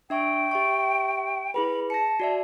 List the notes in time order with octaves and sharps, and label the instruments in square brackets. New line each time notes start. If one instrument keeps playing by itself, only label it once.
[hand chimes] D4 E5 C#6 [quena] G5
[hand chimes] G4 E5 C#6
[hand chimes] E4 G#4 B4 [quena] B5
[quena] A5 [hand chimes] A#6 C#7
[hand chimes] F#4 D5 E5